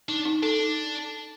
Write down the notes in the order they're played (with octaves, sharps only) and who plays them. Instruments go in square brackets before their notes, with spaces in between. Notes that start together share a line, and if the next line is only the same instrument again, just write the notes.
[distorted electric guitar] D4 [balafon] D#4
[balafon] D#4
[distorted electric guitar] D4 [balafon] A4
[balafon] D#4